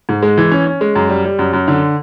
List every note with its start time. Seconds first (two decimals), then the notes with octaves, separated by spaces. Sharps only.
0.09 G#2
0.22 G#3
0.38 E3
0.51 C#4
0.66 C#4
0.81 G#3
0.95 F#2
1.09 G3
1.24 G3
1.39 F#2
1.53 F#2
1.68 D3